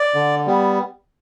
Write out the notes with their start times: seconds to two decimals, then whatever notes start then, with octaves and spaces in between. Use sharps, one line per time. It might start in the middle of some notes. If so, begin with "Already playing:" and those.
Already playing: D5
0.14 D3
0.46 G3 B3